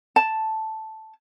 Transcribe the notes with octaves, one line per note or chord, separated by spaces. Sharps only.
A5